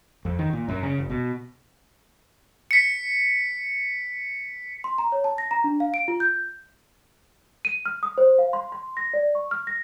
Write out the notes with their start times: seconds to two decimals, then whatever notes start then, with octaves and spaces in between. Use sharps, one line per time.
0.25 F2
0.39 D#3
0.53 A#2
0.68 F#2
0.83 C#3
0.98 F#1
1.10 B2
2.71 B6 C#7
4.84 C6
4.98 A#5
5.12 C#5
5.24 A5
5.38 A#6
5.51 A#5
5.64 D4
5.80 F5
5.94 D7
6.08 F4
6.20 G6
7.65 D#7
7.86 F6
8.03 D#6
8.18 C5
8.39 F5
8.53 C6
8.72 C6
8.97 A#6
9.14 D5
9.35 C#6
9.51 F6
9.67 A#6